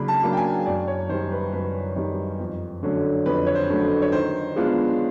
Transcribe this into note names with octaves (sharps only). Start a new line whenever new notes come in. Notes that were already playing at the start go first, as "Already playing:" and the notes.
Already playing: C#3 F#3 A#3 D4 B5
A5
F#3 A#3 D4
G5
G#5
F#2 D5
C#5
D#3 G3 C5
B4
F#2 B4
D#3 G3
F2
D3 F#3 A3 C#4
F2 B4
C#5
C5
D3 F#3 A3 C#4
C#5
D#3 C5
G#3 B3 D4 F4